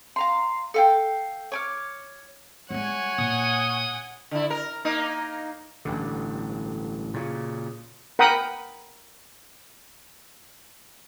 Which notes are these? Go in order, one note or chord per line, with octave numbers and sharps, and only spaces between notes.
F5 A#5 C6
A4 F5 G5
C#5 D6 F6
G3 G#3 C#5 F#5 G#5
A#2 D#6
D3 E4
A#4
A#3 D#4
A1 G2 D3
A#2 C#3
A#4 F#5 G5 B5 D#6